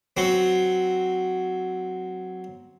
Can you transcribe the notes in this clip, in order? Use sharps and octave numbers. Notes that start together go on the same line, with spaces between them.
F#3 C4